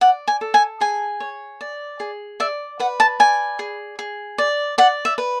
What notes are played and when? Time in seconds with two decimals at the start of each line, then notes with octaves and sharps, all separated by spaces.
0.01 D5 F#5
0.28 G#5
0.41 A4
0.54 G#5
0.81 G#4 G#5
1.20 C#5
1.61 D5
2.00 G#4
2.40 D5 E5
2.80 B4 F#5
3.00 A5
3.20 D5 G#5
3.59 G#4
3.99 G#4
4.38 D5
4.78 D5 F#5
5.05 E5
5.18 B4